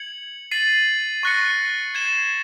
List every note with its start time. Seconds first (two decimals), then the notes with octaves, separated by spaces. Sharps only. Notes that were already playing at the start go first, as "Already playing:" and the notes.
Already playing: G#6 C#7 F#7
0.51 A6 C7 D#7 F#7
1.23 C#6 F#6 A#6 C#7
1.95 G#6 C7 E7 G7